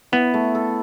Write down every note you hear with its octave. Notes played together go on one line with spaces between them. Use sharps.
B3 E4
A3
A4